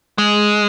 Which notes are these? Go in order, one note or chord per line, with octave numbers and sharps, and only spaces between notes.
G#3